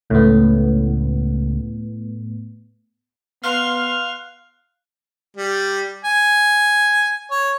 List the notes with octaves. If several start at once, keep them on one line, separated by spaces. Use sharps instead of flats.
C#2 A2 B3
B3 F5 C6 F6 F#6 F7
G3
G#5
C#5